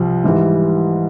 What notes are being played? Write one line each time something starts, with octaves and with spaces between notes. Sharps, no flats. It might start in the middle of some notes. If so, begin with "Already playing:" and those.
Already playing: C2 F3
G#2 E3 G3